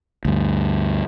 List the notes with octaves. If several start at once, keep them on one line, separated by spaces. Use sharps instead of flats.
D2 G2